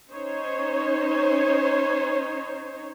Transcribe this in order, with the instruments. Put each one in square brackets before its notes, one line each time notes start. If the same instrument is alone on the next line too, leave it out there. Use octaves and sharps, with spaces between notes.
[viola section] C#4 D#4 C5 C#5